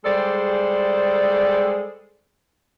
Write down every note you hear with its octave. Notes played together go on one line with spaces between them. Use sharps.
G3 G#3 G#4 A4 C5 D5